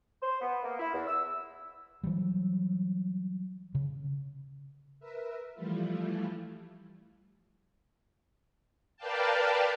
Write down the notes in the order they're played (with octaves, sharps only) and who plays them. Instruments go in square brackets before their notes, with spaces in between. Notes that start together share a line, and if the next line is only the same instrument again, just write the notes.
[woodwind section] C5
B3
A#3
E4
E2
E6
[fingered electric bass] E3 F#3 G3
C#3
[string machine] A#4 B4 E5
E3 F3 G3 A3 E4 F4
A#4 B4 D5 F5 G5 A5